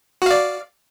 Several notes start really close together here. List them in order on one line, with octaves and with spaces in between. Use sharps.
F#4 F5 D5